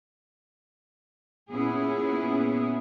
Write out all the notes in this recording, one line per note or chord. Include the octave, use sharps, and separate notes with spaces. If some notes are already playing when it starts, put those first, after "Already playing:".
A#2 B3 C#4 E4 G#4